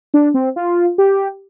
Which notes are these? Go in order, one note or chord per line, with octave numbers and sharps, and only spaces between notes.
D4
C4
F4
G4